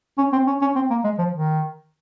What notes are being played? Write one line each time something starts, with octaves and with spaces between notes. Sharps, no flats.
C#4
C4
C#4
C#4
C4
A#3
G#3
F3
D#3